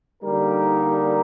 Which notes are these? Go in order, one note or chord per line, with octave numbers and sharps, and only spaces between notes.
D3 G3 A#3 D#4 A#4